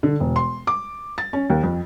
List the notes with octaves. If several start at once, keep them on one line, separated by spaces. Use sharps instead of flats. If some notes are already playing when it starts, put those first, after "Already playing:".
D3
E1
C6
D6
A6
C#4
D#2
F2